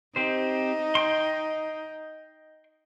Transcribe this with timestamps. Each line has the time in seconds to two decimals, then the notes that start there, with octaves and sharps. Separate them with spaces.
0.16 C4 D#4 G4 C5
0.95 D#5 G5 C6